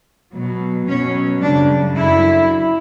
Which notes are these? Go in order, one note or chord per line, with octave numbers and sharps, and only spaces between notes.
B2 F#3
B2 F#3 C#4
F#2 C#3 G3 D4
F#2 D3 F#3 E4